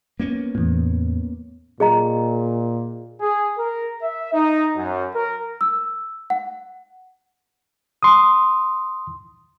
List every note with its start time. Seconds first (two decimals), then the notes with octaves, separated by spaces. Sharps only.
0.20 A#3 B3 C#4
0.55 E2 A2
1.80 A#2 G#4 D#5 A#5
3.21 G#4
3.58 A#4
4.03 E5
4.33 D#4
4.76 F#2
5.15 A#4
5.61 E6
6.30 F#5
8.03 C6 D#6